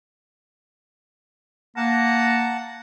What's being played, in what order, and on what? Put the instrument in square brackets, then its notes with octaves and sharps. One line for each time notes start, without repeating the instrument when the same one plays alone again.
[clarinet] A#3 [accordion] F#5 A5 [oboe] A#5